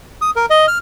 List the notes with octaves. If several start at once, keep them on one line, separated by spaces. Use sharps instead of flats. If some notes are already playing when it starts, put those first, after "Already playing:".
D#6
A#4
D#5
F6